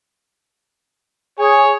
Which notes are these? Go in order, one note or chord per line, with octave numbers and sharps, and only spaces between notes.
G#4 C#5 G#5